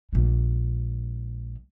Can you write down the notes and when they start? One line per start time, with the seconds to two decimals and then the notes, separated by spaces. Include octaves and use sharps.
0.13 A#1 G#3